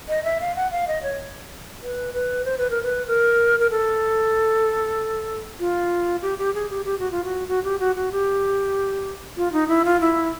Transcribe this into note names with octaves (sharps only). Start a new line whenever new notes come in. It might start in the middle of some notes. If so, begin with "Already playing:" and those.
D#5
E5
F5
F#5
F5
D#5
C#5
B4
B4
C5
B4
A#4
B4
A#4
A#4
A4
F4
G4
G4
G#4
G4
G4
F#4
F4
F#4
F#4
G4
F#4
F#4
G4
F4
D#4
E4
F4
E4